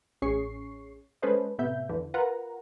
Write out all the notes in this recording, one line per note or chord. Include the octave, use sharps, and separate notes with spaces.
A1 C#4 G#4 C#6 C7
G#3 C#4 A4 B4 C5 D#5
A2 C3 B3 E5 G6
E2 D3 E3
F4 A#4 B4 F#5 A#5